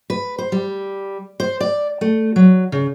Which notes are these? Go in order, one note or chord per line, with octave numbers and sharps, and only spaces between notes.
B4
C5
G3
C5
D5
A3
F#3
C#3